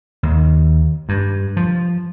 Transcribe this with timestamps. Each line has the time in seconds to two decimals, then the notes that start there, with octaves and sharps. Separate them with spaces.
0.23 D#2
1.09 G2
1.57 F3